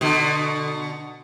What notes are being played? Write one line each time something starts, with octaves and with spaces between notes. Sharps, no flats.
B2 D3